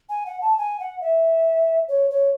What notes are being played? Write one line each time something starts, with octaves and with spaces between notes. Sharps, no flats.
G#5
F#5
A5
G#5
F#5
E5
C#5
C#5